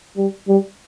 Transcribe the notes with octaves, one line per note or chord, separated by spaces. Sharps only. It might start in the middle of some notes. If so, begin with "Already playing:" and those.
G3
G3